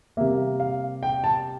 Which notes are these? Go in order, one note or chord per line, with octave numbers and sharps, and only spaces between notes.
C3 G3 A#3 E5
F5
G5
A5